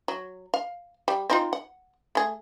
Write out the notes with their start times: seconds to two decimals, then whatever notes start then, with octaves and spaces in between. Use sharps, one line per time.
0.08 F#3
0.54 F5
1.08 G3
1.30 C4 D#4 F4
1.53 F#5
2.15 A3 G#4